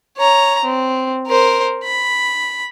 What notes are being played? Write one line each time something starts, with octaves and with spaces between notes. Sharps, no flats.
C#5 A#5
C4
A#4 C5
B5